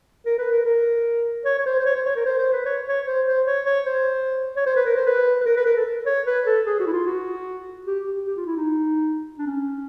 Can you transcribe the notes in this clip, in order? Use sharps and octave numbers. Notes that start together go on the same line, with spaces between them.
A#4
B4
A#4
A#4
C#5
C#5
C5
C5
C#5
C5
C#5
A#4
C5
C5
B4
C#5
C#5
C5
C5
C#5
C#5
C5
C#5
C5
B4
A#4
C5
B4
B4
A#4
B4
A#4
A4
C#5
B4
A4
G#4
F#4
E4
F4
F#4
G4
G4
G4
F4
E4
D#4
D4
C#4